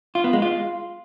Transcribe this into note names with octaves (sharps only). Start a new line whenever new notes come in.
F4
B3
G#3
F4